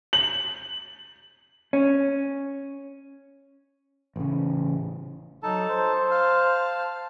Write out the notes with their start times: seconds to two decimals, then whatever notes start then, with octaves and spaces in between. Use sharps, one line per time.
0.13 F#7
1.73 C#4
4.16 A1 C#3
5.43 F#3 D#4 A4 A5
5.69 C5
6.11 F5 A5 F6